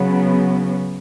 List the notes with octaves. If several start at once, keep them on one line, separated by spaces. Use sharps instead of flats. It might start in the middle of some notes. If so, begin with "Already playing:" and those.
Already playing: C#3 F#3 B3